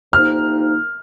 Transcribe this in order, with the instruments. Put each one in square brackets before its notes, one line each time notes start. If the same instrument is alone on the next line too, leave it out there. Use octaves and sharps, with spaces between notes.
[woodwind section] D2 C3 F3 A#3 D#4 [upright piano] F6